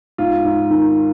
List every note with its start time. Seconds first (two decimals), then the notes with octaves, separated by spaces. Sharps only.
0.18 G#2 F4
0.45 G#2
0.70 D#3